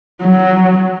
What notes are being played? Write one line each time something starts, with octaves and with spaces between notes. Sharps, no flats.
F#3